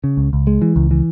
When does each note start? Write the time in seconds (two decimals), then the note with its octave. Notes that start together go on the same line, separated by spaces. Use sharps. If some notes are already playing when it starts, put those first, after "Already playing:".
0.04 C#3
0.17 C#2
0.33 C#2
0.47 G#3
0.62 E3
0.76 C#2
0.91 E3